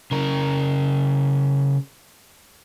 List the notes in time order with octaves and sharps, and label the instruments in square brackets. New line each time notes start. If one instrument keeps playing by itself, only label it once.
[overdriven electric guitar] C#3 A#4